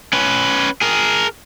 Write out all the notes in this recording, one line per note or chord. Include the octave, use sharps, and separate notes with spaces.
C#4 B4
G#4 A#4